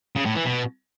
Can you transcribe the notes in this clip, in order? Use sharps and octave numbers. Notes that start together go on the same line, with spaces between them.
C#3
A2
E3
B2